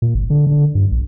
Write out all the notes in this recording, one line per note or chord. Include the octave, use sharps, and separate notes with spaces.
A#2
G#1
D3
D3
G2
A#1